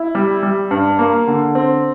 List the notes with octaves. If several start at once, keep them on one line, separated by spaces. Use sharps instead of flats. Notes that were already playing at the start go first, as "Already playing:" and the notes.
Already playing: E4
G3
G3
G2
A#3
D3
C4